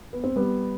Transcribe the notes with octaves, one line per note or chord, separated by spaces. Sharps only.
B3
C4
G3 B3